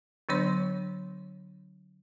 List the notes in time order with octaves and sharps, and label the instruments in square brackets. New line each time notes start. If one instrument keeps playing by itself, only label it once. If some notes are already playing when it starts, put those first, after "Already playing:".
[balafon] D3 F#3 B3 D4 C#5 C6